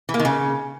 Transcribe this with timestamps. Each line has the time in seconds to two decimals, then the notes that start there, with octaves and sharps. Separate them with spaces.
0.09 E3
0.14 A#3
0.19 D#3
0.25 C#3